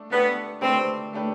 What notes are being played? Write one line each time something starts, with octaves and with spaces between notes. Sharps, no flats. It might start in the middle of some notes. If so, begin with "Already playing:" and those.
Already playing: A3 D4
A3 B3 D4 G4 B4
A3 C4 D4 G4 B4
A3 D4 G4 B4